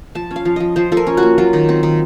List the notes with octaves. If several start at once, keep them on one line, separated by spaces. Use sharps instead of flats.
F3 A5
C#4
F5
F3
F3 D#5
F3 C5
F3 A4
A#4
C#4
F#4
A#3
F#3 F4
D#3
C4
D#3